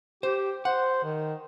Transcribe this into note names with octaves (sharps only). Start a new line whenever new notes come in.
G4 C5
C5 F#5
D#3